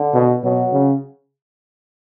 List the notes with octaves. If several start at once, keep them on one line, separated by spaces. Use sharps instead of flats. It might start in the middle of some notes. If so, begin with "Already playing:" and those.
Already playing: D3
B2
B2 F#3
C#3